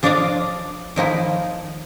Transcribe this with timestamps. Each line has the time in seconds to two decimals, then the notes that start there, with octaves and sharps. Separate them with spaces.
0.03 F3 D4 F4 D5 D#5 F5
0.96 D#3 F3 D#4 E4